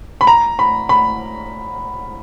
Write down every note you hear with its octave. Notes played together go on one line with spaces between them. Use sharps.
B5
A#5
B5
B5